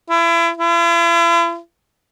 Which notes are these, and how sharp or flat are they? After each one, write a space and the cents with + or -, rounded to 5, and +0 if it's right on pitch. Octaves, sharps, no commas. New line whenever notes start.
E4 +35
E4 +45